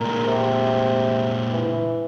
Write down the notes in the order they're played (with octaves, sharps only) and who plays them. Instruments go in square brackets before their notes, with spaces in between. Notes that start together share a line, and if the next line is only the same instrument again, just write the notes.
[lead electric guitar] A#2 G#3 [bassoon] A#4
[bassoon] C3
E3